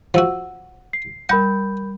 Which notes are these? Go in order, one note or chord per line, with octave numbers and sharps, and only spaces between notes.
F3 F#4 F#5 E6
C7
G3 A#4 F#5 B5 G6